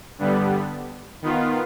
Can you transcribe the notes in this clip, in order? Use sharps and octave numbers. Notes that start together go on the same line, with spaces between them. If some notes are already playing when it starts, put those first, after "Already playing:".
G2 D3 G3 B3
D#3 B3 F4